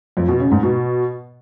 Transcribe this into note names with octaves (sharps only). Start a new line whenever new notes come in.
F2
B2
C#3
G#2
B2